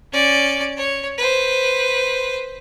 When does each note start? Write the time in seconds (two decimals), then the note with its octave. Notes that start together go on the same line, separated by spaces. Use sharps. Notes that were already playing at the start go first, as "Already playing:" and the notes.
0.12 C#4 D5
0.77 C#5
1.18 B4 C5